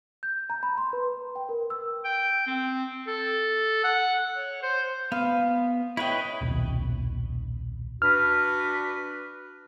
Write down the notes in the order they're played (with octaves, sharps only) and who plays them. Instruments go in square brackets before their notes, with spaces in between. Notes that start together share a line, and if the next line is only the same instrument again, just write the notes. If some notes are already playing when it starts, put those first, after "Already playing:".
[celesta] G6
A#5
B5
C6
B4
G5
A#4
E6
[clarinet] G5
C4
A4
F#5
C#5
C5
[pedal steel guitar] B3 [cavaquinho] F5
[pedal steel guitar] E4 B4 D#5 [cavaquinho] C#5 G5
[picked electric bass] D#1 B1
[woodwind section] D4 F#4 B4 [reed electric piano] F6